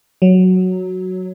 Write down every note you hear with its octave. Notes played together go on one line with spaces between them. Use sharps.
F#3